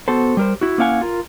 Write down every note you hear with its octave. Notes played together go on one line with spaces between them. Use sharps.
B3 F#4 A4 C5
G3 A#4 C5
E4 F#4
A#3 C#4 E4 F5 F#5 G#5
F4 A#4